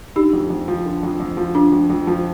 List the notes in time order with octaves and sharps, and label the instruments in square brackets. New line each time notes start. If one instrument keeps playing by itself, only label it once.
[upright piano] D3 [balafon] D#4 G4
[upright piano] F2
F2
F3
D3
F2
F2
F3
[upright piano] D3 [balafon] D4 F4
[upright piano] F2
F2
F3